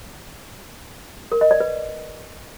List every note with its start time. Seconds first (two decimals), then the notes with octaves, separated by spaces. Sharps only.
1.32 A#4
1.41 D#5
1.51 D5
1.60 B4